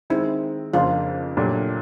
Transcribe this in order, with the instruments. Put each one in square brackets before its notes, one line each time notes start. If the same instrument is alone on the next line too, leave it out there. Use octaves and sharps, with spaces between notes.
[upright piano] D#3 G#3 C4 [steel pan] E4
[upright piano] F2 C#3 F3 A#3 D4 [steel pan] F4
[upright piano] A#2 F#3 A3 D4 G4